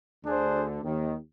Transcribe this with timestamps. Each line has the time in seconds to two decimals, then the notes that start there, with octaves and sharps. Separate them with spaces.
0.24 D2 D3 D4 G#4 C5
0.83 D#2 D#3